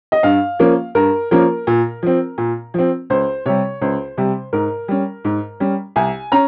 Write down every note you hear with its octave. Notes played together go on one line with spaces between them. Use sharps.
D#5
G2 F5
F3 A#3 C#4
G2 A#4
F3 A#3 C#4 A#4
A#2
F3 C4
A#2
F3 C4
C#2 C5
C3 G3 C#5
C#2 C5
C3 G3
G#2 A#4
G3 C#4
G#2
G3 C#4
C2 G#5
C#4 A#5